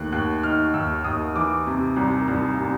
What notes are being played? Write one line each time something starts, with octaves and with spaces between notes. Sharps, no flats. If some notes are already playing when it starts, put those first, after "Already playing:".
Already playing: D#2 A3 F#6
D#2 F#6
D#3 F6
D#2 E6
D#2 D#6
E3 D6
C3
C2
C2
C3